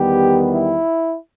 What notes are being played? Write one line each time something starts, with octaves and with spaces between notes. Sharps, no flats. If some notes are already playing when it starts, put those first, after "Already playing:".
Already playing: E2 D#3 G3 B3 G4
E4